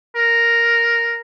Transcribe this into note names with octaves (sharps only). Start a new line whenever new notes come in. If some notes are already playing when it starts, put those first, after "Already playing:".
A#4